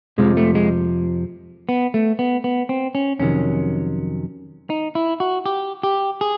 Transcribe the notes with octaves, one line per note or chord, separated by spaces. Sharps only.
F2 C3 F3 G#3
A3
G#3
B3
A3
B3
B3
C4
C#4
F2 C3 D#3 F#3 C#4
D#4
E4
F#4
G4
G4
G#4